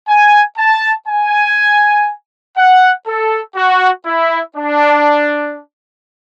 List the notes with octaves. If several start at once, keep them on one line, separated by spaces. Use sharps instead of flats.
G#5
A5
G#5
F#5
A4
F#4
E4
D4